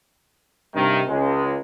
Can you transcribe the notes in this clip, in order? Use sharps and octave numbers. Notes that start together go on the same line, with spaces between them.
G2 C3 D#3
C#2 G#3